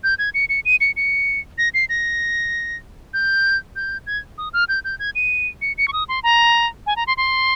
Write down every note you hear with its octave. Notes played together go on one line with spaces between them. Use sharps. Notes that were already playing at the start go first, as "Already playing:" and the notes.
G6
G#6
C#7
C#7
D#7
C#7
C#7
A#6
C7
A#6
G6
G6
G#6
D#6
F6
G6
G6
G#6
D#7
C#7
C#7
C#6
D#6
C6
A#5
G#5
A#5
C6
C6